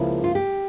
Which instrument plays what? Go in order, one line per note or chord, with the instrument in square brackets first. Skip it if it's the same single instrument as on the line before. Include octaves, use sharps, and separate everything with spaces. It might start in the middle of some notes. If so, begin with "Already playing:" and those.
Already playing: [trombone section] C#2 C#3 F3 A#3 E4
[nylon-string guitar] F4
G4